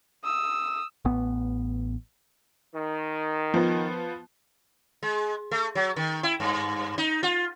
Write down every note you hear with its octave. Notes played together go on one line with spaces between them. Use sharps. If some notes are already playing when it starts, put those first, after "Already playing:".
D#6 E6
A1 B3
D#3
F3 B3
G#3
A3
F#3
D#3
E4
G2
D#4
F4